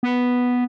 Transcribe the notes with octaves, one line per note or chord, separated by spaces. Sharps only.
B3